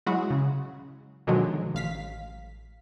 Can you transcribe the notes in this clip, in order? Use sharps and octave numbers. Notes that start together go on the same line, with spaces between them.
F#3 G#3 E4 F#4
C#3
B2 D3 D#3 F3 F#3 G#3
A1 F5 B6